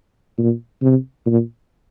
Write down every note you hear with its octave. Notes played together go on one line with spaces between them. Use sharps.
A#2
C3
A#2